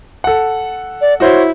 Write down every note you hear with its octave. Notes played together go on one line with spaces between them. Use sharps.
A4 F#5
D5
E4 F#4 C5 C#5